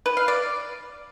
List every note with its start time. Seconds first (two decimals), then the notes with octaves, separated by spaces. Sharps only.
0.06 B4
0.17 F5
0.28 D5